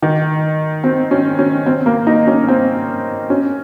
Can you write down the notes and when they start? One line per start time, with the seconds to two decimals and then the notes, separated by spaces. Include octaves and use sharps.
0.02 D#3
0.84 C4
1.11 C#4
1.39 C#4
1.66 C4
1.86 A#3
2.07 D#4
2.27 C#4
2.48 C4
3.30 C#4